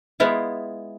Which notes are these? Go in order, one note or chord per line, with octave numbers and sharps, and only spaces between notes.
G#3 B3 E4 F4